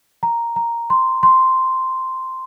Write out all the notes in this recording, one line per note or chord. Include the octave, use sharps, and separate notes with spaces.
A#5
A#5
C6
C6